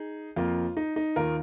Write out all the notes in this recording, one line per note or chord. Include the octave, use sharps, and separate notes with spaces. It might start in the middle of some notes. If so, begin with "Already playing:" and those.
Already playing: D#4 G#4
F2 F3 A#3 F4
D#4
D#4
D#2 D#3 A#3 F4 A#4